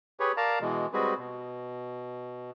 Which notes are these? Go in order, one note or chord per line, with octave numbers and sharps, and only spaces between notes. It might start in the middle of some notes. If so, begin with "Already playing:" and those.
G4 G#4 B4 C#5
A#4 D5 F5 A5 A#5
B2 E3 G#3
G3 G#3 C4 F#4 G#4 B4
B2